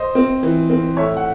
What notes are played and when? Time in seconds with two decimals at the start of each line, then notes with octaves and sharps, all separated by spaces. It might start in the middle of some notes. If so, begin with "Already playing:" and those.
Already playing: C5 D#5
0.15 C4
0.43 E3
0.70 C4
0.97 A2 C#5 E5
1.17 F#5